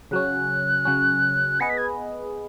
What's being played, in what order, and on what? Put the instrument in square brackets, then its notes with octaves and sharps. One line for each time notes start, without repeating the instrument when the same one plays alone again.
[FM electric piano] C#3 F#3 C#4 [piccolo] F#6
[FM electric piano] C#3 F#3 C#4
[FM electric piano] B3 G#4 B4 D#5 [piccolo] C#7
[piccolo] B6
G#6